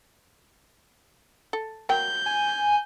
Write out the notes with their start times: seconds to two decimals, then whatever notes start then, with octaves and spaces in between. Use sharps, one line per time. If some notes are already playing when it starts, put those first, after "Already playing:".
1.53 A4
1.89 F#3 A#3 G5 G6
2.26 G#5